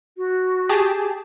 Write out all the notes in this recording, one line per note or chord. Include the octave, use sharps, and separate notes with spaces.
F#4
G4 G#4 A5